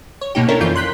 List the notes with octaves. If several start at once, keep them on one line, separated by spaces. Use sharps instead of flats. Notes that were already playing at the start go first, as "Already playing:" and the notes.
C#5
B2 A#3 D#4 G4
C#4 D4 E4 A4 A#4 C#5
F2 E3 F4 G6
C6 F#6 G6 B6